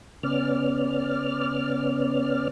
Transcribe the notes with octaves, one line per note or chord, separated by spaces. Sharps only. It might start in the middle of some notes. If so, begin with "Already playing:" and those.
C#3 B3 C#4 D5 F6